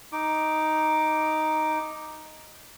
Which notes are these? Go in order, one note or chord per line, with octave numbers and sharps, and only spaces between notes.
D#4 D6